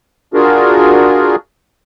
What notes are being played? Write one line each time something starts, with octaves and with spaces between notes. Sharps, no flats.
D4 F4 F#4 G#4 A#4